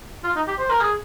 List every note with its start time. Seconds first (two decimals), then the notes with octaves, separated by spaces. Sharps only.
0.24 F4
0.36 D#4
0.48 G4
0.59 C5
0.70 A#4
0.80 G#4